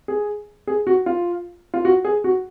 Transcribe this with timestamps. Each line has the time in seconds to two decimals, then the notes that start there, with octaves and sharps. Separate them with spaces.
0.08 G#4
0.67 G#4
0.87 F#4
1.06 F4
1.74 F4
1.85 F#4
2.05 G#4
2.24 F#4